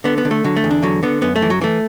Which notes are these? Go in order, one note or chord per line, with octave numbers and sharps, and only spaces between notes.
D3 B3
B3
D3
A3
D3 F#3
A3
E2
D4
D3 F#3
D3 B3
F#2 B3
A3
E3
F#3
E3 A3